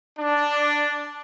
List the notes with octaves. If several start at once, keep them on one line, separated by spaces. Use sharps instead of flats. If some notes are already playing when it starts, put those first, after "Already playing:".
D4